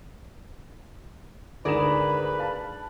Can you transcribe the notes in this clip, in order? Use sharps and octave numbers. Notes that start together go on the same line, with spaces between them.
D2 G#2 G#4 A#4 B4 D5 B5 E7
F5 A5